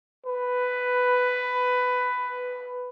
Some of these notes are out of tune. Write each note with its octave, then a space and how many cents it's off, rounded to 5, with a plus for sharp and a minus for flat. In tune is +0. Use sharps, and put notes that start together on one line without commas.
B4 +10